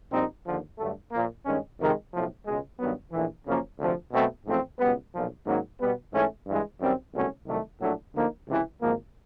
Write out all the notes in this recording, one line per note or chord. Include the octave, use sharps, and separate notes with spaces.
A#1 A#2 G3 C4 D#4
D#2 D3 F3
G2 D3 F#3 A3
A#2 F3 A#3
G2 D#3 G#3 C#4
F2 C3 D#3 G#3
B1 A2 F3
C#2 B2 G#3
G2 D#3 F#3 B3
A#1 A2 E3
F#2 C#3 F3 A#3 C#4
D2 C3 F3
B2 F#3 A3 C4
A1 G#2 F3 A3 C4
C#2 B2 G3 B3
B1 A#2 F3
G#2 D#3 F#3 A#3 C#4
B2 G3 B3
G#2 E3 A3 C#4
G2 E3 G#3
F#2 D#3 G3 C4
C2 B2 F#3 A3 C#4
C2 C3 D#3 F#3 A3
A#1 A2 F#3 A3 D4
D2 D3 F3 A#3 D#4
C#2 C3 E3
G#1 G#2 F3 A#3